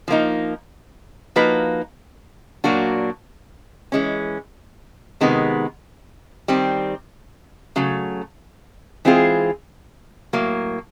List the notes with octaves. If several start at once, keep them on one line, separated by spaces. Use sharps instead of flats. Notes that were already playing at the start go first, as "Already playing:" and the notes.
F3 A#3 D#4
F3 A#3 D#4 F#4 B4
A#2 F#3 A#3 D4 F#4
E3 G#3 C#4
C3 D#3 G#3 B3
D#3 G3 C4
C#3 F#3 A3
E3 G#3 C4 F4 G#4
A2 F#3 A#3